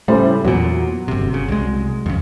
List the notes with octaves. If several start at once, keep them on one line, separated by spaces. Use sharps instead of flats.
A2 C#3 G3 C5
E2 A#2 F#3
G1 C3
C#3
C2 G#3
F2 C#3